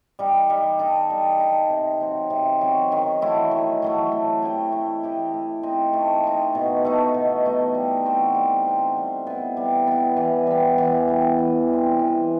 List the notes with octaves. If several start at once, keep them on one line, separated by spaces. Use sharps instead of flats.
G3 D#4
G3
D#4 A4
G3
D#4 A4
C3
F#3 C4
C3
F#3 C4
D#3
F#3 A3 E4
D#3
F#3 A3 E4
A3
E4 G4 D#5
A3
E4 G4 D#5
A3
C4 D#4
A3
C4 D#4
B2
A3 D#4
B2
A3 D#4
G3
C4 F#4 C5
G3
C4 F#4 C5
G3
B3 E4
G3
B3 E4
E3
G3 B3
E3
G3 B3
E3
G3 C4
E3